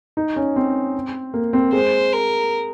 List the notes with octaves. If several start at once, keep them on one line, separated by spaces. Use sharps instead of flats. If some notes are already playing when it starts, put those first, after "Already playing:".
D#4
C#4
C4
A#3
C4
G#3 C5
A#4